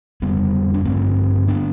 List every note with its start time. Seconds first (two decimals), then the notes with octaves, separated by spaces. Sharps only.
0.22 F2 D3 G3 B3
0.74 D4
0.85 G2 D3 A3 C4
1.48 D3 B3 D4